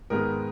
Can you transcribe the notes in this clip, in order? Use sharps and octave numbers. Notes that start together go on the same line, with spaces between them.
G#2 D#3 G#3 B3 A#4